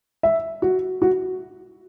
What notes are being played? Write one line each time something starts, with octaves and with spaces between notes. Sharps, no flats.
E5
F#4
F#4